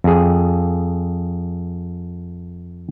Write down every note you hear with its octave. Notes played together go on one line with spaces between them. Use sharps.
F2 G#4